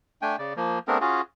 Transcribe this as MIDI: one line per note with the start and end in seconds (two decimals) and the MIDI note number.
0.22 0.36 57
0.22 0.36 62
0.22 0.36 79
0.22 0.36 80
0.38 0.53 49
0.38 0.53 74
0.56 0.79 53
0.56 0.79 58
0.88 0.98 57
0.88 0.98 59
0.88 0.98 60
0.88 0.98 62
0.88 0.98 68
0.88 0.98 70
1.01 1.21 61
1.01 1.21 65
1.01 1.21 66
1.01 1.21 68